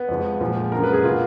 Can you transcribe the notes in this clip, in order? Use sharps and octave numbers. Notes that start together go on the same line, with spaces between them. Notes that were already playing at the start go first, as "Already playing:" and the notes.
Already playing: B3
F2 F3 G#3
A#2 F3 G#3
F#2 D3 G#3 A#4
B4
G#4
B2 A#3 F4